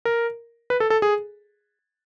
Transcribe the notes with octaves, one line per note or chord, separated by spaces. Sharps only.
A#4
B4
A4
A4
G#4